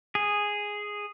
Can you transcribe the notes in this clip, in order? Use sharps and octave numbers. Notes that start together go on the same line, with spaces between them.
G#4